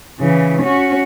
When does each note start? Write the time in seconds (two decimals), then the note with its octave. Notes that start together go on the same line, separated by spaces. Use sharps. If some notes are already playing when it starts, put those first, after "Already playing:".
0.21 C#3 E3
0.63 C#4 F#4